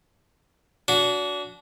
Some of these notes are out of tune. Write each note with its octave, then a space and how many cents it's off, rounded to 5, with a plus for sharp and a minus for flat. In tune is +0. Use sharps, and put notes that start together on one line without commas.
D4 -35 F#4 -15